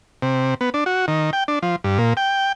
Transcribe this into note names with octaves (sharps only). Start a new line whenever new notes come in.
C3
B3
D4
F#4
D#3
G5
D4
F3
G2
A#2
G5